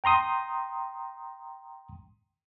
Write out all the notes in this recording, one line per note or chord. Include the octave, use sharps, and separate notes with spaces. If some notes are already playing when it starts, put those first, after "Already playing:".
G5 A#5 C6 D#6